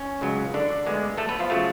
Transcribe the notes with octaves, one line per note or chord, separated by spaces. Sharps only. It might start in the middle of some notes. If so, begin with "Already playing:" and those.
Already playing: C#4
C#2 C#3 F#3
D3 D4
D2 D3 G#3 B3
A3 A4
B3 B4
F3 F4
C#3 F#3 A3